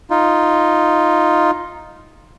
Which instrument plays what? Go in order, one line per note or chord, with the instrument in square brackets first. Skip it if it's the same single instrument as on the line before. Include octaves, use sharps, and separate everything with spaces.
[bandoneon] D#4 F4